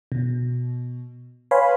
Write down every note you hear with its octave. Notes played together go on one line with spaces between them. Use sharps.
B2
B4 C#5 F5 G#5 B5 C6